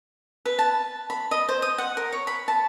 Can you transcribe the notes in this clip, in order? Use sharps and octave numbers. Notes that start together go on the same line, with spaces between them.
B4
A5
B5
D#5
C5
D#6
F#5
A#4
C#5
B5
A5